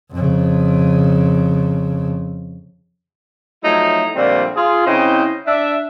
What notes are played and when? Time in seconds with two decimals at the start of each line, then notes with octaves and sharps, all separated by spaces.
0.11 F2 C#3
3.63 F3 F#3 A3 D#4 E4
4.14 A#2 D3 F3 G3 A3 C4
4.55 F4 G#4
4.85 C#3 C4 E4 C5 D#5 G5
5.46 D4 E5